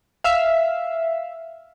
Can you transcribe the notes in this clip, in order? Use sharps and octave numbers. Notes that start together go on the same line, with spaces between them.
E5 F5